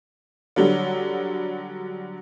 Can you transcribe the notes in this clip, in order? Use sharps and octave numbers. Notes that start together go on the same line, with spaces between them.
D3 F#3 G3